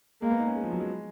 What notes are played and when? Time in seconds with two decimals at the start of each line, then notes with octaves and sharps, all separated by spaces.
0.22 G#3 A#3
0.31 B3
0.39 D#4
0.47 C#4
0.56 G#3
0.63 F3
0.72 F#3
0.80 G#3